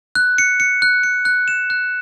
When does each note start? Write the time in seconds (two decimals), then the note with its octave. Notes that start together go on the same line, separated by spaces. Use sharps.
0.15 F#6
0.38 C#7
0.60 C#7
0.82 F#6
1.03 C#7
1.25 F#6
1.48 E7
1.70 F#6